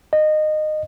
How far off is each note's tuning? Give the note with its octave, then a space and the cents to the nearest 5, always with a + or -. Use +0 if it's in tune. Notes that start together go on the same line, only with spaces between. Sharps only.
D#5 -20